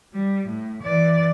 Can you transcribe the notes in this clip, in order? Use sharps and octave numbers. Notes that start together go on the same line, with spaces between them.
G3
A2
E3 D5